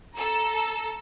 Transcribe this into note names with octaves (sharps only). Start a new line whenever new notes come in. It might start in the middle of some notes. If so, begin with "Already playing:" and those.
A4 A#5 E6